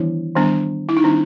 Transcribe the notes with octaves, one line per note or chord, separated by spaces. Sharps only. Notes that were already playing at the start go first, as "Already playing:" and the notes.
Already playing: D#3 E3 G3 B3 D4 E4
D#3 G3 B3 D4
E4
D#4
D#3 G3 C4 D4